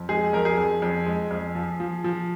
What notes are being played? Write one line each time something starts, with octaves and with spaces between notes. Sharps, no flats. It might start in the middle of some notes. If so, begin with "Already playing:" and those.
Already playing: F2
G#3 G#4
F2 A#4
G#4
F2
F2
G#3
F2
F3
F3
F3